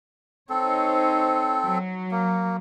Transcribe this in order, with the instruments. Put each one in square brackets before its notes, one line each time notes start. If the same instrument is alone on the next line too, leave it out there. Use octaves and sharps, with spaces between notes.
[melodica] C4 A4 [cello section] D#4 C5 C#5
[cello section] F#3
[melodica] A#3